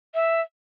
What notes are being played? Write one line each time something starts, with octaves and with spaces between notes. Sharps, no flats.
E5